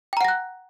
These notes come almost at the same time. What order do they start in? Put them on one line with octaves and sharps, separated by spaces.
G5 A#5 F#5 A#6 F#6